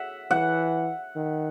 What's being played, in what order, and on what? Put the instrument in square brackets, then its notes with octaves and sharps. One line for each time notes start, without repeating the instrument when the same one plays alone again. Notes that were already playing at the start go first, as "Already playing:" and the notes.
Already playing: [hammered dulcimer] E5 F#5
[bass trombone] E3 [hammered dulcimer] F#5
[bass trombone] D#3